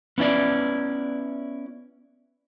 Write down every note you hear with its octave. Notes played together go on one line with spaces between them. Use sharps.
B3 C#4 E4 D5